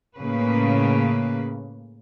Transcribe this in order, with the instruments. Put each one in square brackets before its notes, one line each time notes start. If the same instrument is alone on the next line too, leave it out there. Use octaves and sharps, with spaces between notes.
[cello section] A2 C#3 A#3 B4